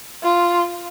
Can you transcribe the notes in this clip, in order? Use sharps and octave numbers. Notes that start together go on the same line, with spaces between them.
F4